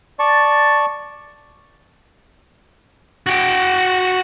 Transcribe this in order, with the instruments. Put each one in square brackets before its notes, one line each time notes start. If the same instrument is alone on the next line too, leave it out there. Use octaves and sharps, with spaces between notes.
[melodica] D5 A5 C#6
[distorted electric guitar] F#4 G5